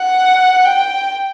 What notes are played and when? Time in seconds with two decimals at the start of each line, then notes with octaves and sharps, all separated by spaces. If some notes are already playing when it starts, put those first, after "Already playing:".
Already playing: F#5
0.65 G5